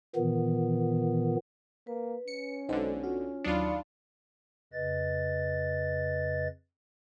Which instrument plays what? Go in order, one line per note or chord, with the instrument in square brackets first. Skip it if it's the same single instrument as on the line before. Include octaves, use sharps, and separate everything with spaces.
[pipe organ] A#2 D#3 E3 B3
[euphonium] A#3 [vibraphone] B4
[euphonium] C#4 [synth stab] C#7
[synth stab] B1 D3 [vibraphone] G#3 [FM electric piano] D#4 C5
[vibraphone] F4 [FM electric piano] F#4
[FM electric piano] D#2 F#3 C#7 [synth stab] D4 F4 [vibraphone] D#4 D5 B5
[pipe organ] F2 C#3 B4 D#5 A6